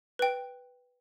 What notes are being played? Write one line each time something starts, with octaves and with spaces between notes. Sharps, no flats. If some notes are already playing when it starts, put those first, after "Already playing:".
B4 G5